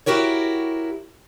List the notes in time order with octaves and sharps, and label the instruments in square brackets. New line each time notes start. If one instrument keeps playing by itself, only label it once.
[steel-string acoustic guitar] E4 F#4 G4 A#4 C#5